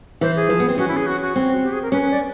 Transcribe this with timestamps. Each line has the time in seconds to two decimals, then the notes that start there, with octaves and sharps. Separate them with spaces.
0.21 E3 C5
0.36 G#4
0.50 F3
0.60 B3
0.69 C4
0.78 C#4 F#4
0.88 E4
0.97 G#4
1.07 F#4
1.21 F#4
1.36 C4
1.64 G4
1.72 G#4
1.82 A#4
1.92 C#4 B4
2.02 B4
2.11 D5